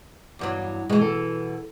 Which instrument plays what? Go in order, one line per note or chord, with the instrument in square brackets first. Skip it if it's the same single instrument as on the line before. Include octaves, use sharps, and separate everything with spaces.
[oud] E2 G2 F#3
[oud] B2 E3 [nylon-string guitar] G#3
[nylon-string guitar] A4